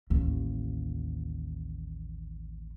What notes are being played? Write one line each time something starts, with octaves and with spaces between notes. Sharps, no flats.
A1 D#2